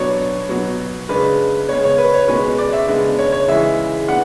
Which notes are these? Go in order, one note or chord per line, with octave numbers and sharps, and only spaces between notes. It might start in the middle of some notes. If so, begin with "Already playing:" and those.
Already playing: B2 F#3 B3 D4 C#5
B2 F#3 B3
C#3 G#3 D4 B4
C#3 G#3 B3 C#5
C#5
B4
C#5
B2 G#3 C#4 B4
D5
E5
C#3 G#3 B3 D4
C#5
C#5
C#3 E3 G#3 E5
B3 D4 F#5